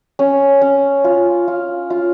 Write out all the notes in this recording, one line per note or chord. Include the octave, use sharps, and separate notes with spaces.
C#4
C#4
F4
F4
F4